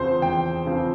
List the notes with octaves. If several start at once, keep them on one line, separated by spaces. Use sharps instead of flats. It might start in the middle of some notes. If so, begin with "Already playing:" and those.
Already playing: E2 C#3 F3 C4 C5
E2 G5
C#3 F3 C4